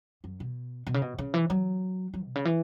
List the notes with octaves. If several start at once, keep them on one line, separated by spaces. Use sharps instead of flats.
F#2
B2
B2
C#3
B2
C#3
E3
F#3
F#3
B2
C#3
E3